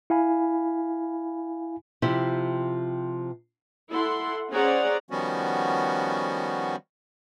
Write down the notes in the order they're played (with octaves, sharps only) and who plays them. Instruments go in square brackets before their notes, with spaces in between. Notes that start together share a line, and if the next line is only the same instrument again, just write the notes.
[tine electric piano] E4 F5 G#5 B5
[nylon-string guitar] C3 F3 E4 G4
[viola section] E4 A4 F#5 C6
C#4 G#4 C5 D5 F#5 A#5
[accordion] D#3 F3 G3 B3 C#4 F#4